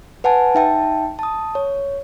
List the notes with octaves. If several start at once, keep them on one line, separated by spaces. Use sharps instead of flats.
B4 F#5 G#5 A5
D#4 E5 G5 A5
A5 D#6
C#5